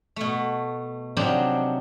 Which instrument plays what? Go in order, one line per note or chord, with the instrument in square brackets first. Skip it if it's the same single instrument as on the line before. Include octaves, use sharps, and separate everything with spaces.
[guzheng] B2 A3
C3 F3 F#3 C4 D4 D#4